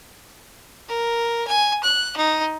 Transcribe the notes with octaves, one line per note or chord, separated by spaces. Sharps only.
A#4
G#5
F#6
D#4